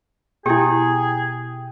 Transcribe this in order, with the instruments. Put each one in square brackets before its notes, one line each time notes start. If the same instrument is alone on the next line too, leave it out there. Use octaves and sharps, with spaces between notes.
[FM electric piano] B2 G5 D#6 [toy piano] E4 G4 [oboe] G#4